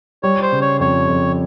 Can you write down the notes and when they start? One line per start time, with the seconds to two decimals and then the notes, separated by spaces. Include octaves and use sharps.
0.23 G3 C#5
0.42 C5
0.52 C#3
0.62 C#5
0.80 F2 C#5
1.09 F2